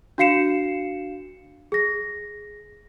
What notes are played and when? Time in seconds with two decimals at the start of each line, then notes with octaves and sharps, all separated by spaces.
0.18 D4 F#4 F5 C7 C#7 E7
1.72 G#4 A#6